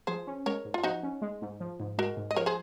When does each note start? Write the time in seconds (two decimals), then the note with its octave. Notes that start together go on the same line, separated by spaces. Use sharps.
0.07 F3 G#4 C5
0.27 C#4
0.46 G#3 A#4 C#5
0.65 G#2
0.74 F4
0.83 F3 D#4 F#4
1.03 C#4
1.22 G#3
1.42 G#2
1.60 F3
1.80 G#2
1.98 G#3 F#4 A#4
2.17 G#2
2.31 D#5
2.36 F3 A#4 C#5
2.46 G#4 C5